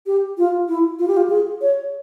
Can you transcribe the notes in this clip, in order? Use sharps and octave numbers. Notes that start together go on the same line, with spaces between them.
G4
F4
E4
F4
G4
F4
G#4
C#5